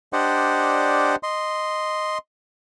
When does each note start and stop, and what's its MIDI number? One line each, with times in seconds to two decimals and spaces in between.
0.13 1.16 62
0.13 1.16 67
0.13 1.16 72
0.13 1.16 74
0.13 1.16 75
0.13 1.16 78
1.23 2.18 75
1.23 2.18 84